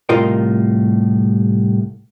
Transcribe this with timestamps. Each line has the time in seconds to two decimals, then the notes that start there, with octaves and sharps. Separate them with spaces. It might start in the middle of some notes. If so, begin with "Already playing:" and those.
0.09 C2 A2 F4 A#4 D#5 G5